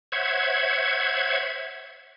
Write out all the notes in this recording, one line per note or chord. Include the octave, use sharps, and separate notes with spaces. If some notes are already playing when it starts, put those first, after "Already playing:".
C5 C#5 E5 F#5 G#6